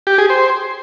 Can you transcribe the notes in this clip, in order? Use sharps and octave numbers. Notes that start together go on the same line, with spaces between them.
G4
G#4
C5